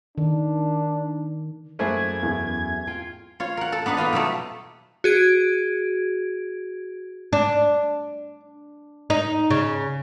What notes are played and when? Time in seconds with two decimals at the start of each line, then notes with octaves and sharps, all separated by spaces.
0.18 D#3 D4
1.79 F#2 A3 A#3 E4 G#4 C5 F#5 G#6
2.23 E2
2.87 F4 G5
3.40 F4 C#5
3.57 A#4 F#5
3.72 A4
3.86 B3 D4 D#4 B4
3.97 A#3 D#4 F4 D#5
4.13 B2 F#3 G3 A3
5.04 F#4 G#4 G#6 D7
7.33 D4
9.10 D#4
9.50 C#3